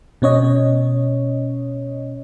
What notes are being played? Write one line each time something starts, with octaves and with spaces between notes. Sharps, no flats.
B2 C#4 C#5 D#5